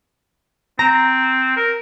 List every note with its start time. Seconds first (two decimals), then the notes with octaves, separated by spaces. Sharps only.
0.79 C4 A#5
1.57 A#4